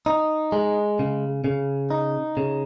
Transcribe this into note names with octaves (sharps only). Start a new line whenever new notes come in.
D#4
G#3
C#3
C#3
D#4
C#3